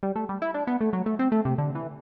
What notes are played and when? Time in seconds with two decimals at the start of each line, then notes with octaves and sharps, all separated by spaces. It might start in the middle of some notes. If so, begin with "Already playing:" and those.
0.03 G3
0.16 A3
0.29 G3
0.42 E4
0.54 D4
0.67 B3
0.81 A3
0.93 F#3
1.06 A3
1.19 C4
1.32 A3
1.45 C3
1.58 D3
1.75 E3